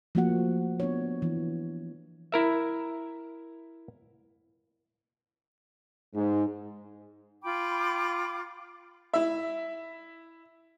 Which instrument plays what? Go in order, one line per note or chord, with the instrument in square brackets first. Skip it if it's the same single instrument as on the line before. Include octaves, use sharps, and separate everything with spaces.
[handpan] F3 A3 A#3 F4 F#4 F#5
B3 D4 C#5
E3
[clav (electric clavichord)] E4 A#4 E5
[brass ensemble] G#2
[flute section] F4 G5 B5 D6
[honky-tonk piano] E4 E5